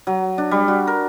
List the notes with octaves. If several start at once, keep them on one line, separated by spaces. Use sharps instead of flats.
F#3
D4
G3
F#4
A#4